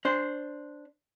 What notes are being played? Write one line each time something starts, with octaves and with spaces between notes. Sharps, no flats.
D4 C5